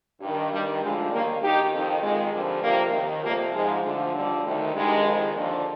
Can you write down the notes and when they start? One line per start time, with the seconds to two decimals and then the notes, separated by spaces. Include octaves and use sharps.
0.21 G2 D#3
0.51 G2 D#3 G3
0.81 D2 D3 F3 G#3
1.11 D#2 D#3 G3 A#3
1.41 G2 D#3 D#4 G4
1.72 F2 D#3
2.02 F2 D#3 G#3
2.32 G2 D3 F3
2.62 F2 C3 F3 G3 A#3
2.92 D#2 D#3
3.22 F2 C3 F3 G3 A#3
3.52 G#2 F3 G#3
3.82 D2 D3 F3
4.13 D#2 D3 F3 G3
4.43 D2 C3 D#3
4.73 G2 D#3 G#3
5.03 F2 D#3
5.34 D#2 D3 F3